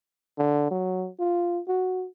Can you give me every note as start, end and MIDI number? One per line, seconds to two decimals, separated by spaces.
0.38 0.68 50
0.71 1.09 54
1.19 1.60 65
1.67 2.06 66